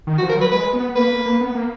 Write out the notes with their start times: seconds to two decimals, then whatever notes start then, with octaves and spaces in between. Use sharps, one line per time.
0.07 D#3
0.18 F#4
0.22 F3
0.29 A#4
0.37 F#3 B4
0.51 G#3 B4
0.73 B3
0.95 A#3 B4
1.10 A#3
1.26 A#3
1.41 B3
1.55 A#3